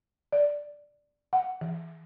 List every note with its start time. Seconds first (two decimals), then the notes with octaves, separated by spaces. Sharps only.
0.32 D5
1.33 F#5
1.61 E3